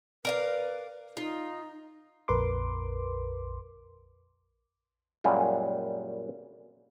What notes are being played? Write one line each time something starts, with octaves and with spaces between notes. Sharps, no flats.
A#4 B4 D5 F5
D#4 F4
A#1 F2 A#4 B4 C6 D6
F#2 A#2 G3 G#3